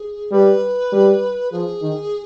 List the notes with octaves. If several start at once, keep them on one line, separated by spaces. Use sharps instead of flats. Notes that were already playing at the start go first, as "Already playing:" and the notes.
Already playing: G#4
G3 B4
G3
F3 G#4
D#3